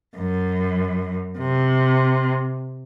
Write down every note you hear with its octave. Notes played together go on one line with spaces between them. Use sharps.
F#2
C3